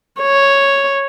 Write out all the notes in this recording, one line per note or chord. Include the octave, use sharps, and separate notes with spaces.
C#5